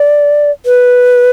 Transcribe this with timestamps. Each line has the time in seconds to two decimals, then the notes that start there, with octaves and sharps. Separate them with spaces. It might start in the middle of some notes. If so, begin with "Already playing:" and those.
Already playing: D5
0.66 B4